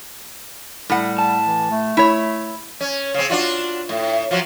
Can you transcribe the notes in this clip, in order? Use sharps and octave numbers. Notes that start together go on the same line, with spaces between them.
A2 G3 F#5
A5
E3
A3
E4 C#5
C#4
C#3 C4
D4 F4 F#4
A2
F3 F#3 F#4